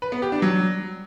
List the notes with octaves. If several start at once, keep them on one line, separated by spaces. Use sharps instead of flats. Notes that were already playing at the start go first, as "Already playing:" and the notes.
B4
B3
G4
D4
F#3